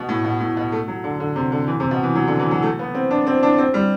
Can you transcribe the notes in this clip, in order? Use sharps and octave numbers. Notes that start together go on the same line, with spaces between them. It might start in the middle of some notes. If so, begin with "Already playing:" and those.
Already playing: B2
A2
B2
A2
B2
A3
F#3
D3
D3
C3
D3
E3
C3
B2
E3
F#3
D3
E3
F#3
A3
B3
C4
D4
C4
D4
C4
G3